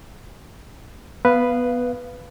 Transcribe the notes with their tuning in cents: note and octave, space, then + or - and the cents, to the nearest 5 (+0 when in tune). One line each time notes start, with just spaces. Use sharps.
B3 +0 B4 +0 F5 -15